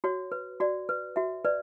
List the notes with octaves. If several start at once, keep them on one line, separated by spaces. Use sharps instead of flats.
F#4 C#5
B4
F#4 D5
B4
F#4 E5
B4 D5